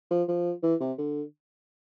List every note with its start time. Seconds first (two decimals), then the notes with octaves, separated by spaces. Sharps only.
0.11 F3
0.28 F3
0.63 E3
0.80 C3
0.98 D3